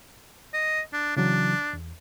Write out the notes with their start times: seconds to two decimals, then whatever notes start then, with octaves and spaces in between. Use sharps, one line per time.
0.53 D#5
0.93 D4
1.17 C#3 E3 F#3 D4
1.73 E2